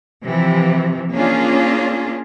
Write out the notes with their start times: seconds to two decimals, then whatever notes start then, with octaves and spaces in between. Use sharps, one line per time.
0.24 C3 E3 F3
1.11 A#3 C#4 D4 F4 G#4